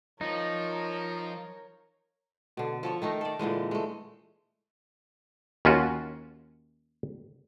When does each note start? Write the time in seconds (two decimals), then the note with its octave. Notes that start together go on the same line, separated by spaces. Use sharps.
0.21 F3 D#4 A#4 C#5
2.57 B2 D3
2.83 F3 A4 C#5
3.02 D#3 A3 D#4 A#4
3.21 A4 D5
3.39 A#2 D3 E3 G#3
3.71 G#3 A3
5.65 D#2 C#4 F4 F#4